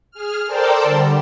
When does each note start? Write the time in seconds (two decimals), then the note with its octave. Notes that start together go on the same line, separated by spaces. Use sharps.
0.11 G#4 F6
0.45 A4 A#4 C5 D5 G5 A5
0.83 D3 G3